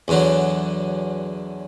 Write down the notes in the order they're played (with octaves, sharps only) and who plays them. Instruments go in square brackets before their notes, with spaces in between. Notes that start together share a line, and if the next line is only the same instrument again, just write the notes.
[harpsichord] E2 D3 F#3